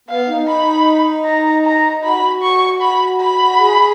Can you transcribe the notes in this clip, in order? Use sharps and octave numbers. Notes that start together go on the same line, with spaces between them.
B3 F5
D#4
B5
A#5
A#5
F#4 B5
C#6
B5
B5
G#4